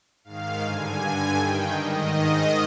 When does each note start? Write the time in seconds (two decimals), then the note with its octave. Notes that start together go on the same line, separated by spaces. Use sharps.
0.24 G#2 D#3 F5
0.62 G2 D3 G#5
0.99 G2 D3
1.36 G2 D#3 G5
1.73 G#2 D#3 D#5
2.10 G#2 D#3